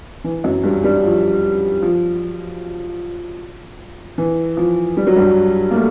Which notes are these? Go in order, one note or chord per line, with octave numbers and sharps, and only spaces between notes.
E3
F#2 F#3
G2 G3
G2 G3
F3
F3
E3
F3
G3
F#3
G2 G3
A#3
A3